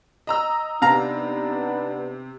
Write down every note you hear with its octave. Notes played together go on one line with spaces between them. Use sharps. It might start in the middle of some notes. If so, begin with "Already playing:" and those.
D#5 A#5 E6
C3 B3 D4 D#4 F5 A#5